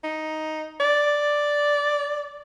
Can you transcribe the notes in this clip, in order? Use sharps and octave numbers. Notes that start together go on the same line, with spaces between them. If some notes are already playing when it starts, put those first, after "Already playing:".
D#4
D5